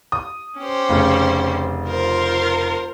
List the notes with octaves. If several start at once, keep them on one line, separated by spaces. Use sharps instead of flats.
D#6
C#4 G4 C5
F1 C#3
F4 A#4 C5